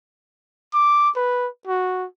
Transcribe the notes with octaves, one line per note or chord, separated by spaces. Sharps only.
D6
B4
F#4